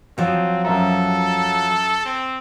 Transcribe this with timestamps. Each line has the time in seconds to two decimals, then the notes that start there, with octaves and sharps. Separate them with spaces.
0.18 F3 F#3 C4
0.65 F#2 A4 E5 A#5
2.06 C4